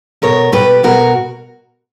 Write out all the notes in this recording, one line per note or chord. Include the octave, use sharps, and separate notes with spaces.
B2 A#4 C#5
B2 G4 B4
B2 F#4 A#4